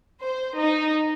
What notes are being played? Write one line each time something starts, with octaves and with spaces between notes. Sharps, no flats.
C5
D#4